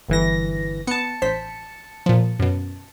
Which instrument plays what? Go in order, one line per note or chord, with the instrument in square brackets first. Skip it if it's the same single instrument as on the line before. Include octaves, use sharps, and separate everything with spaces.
[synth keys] G1 E3 A#6
[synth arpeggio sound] B3 [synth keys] A5 C#7
[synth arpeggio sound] A1 C5 B6
A#2 F3
F#2 B2